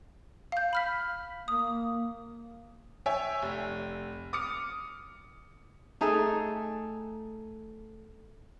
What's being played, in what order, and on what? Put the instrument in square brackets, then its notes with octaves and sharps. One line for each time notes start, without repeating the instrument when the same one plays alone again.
[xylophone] F5 G6
B5 F6 B6
[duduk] A#3 [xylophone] D#6
[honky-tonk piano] C#5 E5 G5 G#5
F1
D6 D#6 F6 C#7
[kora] A3 D#4 G#4 A4